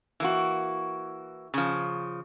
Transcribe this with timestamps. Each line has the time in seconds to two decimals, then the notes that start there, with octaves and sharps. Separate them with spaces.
0.20 E3 A#3 F#4
1.54 C#3 F3